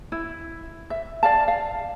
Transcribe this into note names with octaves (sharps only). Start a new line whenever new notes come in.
E4
E5
D5 F5 A5
F5